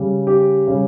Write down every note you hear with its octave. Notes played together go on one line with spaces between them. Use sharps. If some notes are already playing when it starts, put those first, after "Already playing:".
Already playing: C#3 G3
G4
C#3 G3